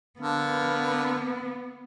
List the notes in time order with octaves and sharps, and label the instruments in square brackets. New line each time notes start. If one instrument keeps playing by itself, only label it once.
[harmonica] D3 A#4 F5 [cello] B3